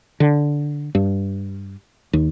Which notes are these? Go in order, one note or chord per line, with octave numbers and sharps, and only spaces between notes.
D3
G2
D#2